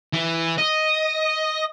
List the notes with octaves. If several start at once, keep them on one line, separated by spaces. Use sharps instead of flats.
E3
D#5